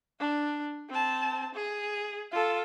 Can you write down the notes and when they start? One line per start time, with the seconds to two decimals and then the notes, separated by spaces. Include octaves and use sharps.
0.20 D4
0.89 C4 A5
1.55 G#4
2.32 F4 A4